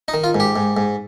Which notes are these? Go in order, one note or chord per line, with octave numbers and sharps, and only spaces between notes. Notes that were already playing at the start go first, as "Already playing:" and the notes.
D#4
D#3
F4
G#2
G4
G#2
G#2